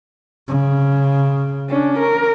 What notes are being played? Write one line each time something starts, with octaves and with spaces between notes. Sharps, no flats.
C#3
C#4 D4
A#4